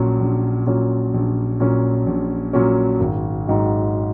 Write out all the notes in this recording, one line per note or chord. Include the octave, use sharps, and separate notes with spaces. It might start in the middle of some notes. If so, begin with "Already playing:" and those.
Already playing: A#1 A#2 F#3 C#4
A#1
A#2 F#3 C#4
A#1
A#2 F#3 C#4
A#1
A#2 F#3 C#4
G#1
G#2 D#3 F#3